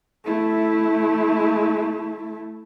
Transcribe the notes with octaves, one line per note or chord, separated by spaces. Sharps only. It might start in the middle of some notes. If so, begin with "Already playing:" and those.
A3 E4